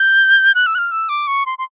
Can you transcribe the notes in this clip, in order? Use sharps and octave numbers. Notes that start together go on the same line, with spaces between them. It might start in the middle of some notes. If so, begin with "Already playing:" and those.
Already playing: G6
F#6
E6
F#6
F6
E6
D6
C#6
C6
C6